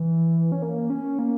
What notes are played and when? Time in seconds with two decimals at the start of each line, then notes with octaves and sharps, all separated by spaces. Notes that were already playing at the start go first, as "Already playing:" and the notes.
Already playing: E3
0.52 C#4
0.62 A#3
0.90 C#4
1.19 A#3